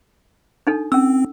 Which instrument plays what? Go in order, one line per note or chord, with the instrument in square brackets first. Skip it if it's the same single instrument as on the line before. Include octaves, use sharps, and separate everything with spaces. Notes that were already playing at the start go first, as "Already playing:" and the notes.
[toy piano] D4 D#4 A4
[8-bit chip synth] C4 [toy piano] C#4 E6